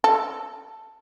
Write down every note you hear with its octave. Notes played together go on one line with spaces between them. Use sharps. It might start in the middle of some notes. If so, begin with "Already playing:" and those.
A4